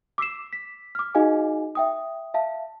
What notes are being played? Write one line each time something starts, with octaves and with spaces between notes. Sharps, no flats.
D6 E6 B6 C7 E7
B6
D6 F6
D#4 F#4 G#4 D#5 F5 G#5
E5 G5 D#6
E5 F5 A5